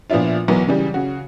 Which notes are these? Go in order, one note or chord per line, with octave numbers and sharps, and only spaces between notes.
A#2 F3 B3 D4 E4 F4
B1 E3 F#3 B3 A#4
C#3 E3 G3
C#3 F#4